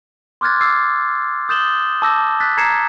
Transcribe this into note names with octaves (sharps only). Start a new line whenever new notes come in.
C6 D6 F6 F#6 G#6 A6
D6 E6 A6 C7
D#6 G6 A6 E7 F#7 G7
A5 D6 E6 G6 A#6
F#6 A6 B6
A#5 G#6 C7 C#7 E7